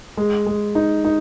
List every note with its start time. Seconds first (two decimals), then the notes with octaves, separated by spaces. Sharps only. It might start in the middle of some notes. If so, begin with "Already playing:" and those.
0.17 G#3
0.46 G#3
0.75 D#4
1.05 D#4